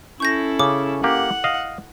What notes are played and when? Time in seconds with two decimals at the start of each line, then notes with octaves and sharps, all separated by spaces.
0.20 C#4 E4 A4 C#6 G6 A#6
0.59 C#3 D6
1.04 A#3 G4 F#5
1.44 D#5 F5